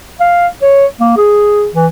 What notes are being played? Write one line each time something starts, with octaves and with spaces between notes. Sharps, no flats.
F5
C#5
A#3
G#4
E3